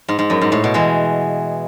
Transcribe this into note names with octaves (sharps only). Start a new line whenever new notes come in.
G#2
G#2
F#2
G#2
A2
B2
E3 G#3